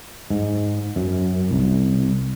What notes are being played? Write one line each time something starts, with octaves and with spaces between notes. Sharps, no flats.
G#2
F#2
C2